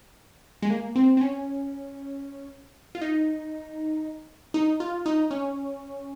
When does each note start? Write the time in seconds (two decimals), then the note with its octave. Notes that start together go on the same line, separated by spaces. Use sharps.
0.62 G#3
0.70 A#3
0.96 C4
1.17 C4
1.21 C#4
2.95 F4
3.01 D#4
4.54 D#4
4.80 F4
5.06 D#4
5.31 C#4